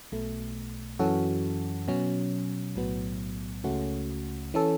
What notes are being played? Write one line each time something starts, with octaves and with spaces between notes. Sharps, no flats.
B1 B2 A3
F#2 E3 C#4 F#4 A4
B2 F#3 C#4
B1 A2 F#3 B3
C#2 C#3 A3 C#4 F#4
E3 C#4 A4